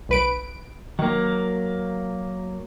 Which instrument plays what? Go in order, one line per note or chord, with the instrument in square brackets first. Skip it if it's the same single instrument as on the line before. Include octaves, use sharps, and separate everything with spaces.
[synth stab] B1 B4 D7
[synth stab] D#3 [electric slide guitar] F#3 A#3